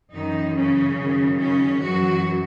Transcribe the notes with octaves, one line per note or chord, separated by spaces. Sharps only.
F#2 D#3 E3 D#4
C#3 C#4
F#2 D#3
C#3 C#4
F#2 E3 F#3 F#4